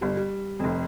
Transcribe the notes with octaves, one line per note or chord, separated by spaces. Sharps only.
G1 G3
G3
F1 F2